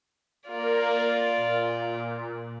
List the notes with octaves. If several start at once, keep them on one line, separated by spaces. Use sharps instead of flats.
A#3 F4 A#4 D5
A#2